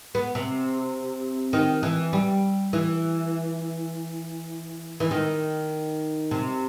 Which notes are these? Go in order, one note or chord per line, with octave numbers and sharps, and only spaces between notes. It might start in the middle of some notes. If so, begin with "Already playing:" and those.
B3
C3
D#3
E3
G3
E3
E3
D#3
C3